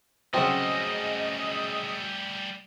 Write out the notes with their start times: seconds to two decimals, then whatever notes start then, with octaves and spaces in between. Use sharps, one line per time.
0.34 C#3 F#3 G3 A3 C4 F#4 D#5 E5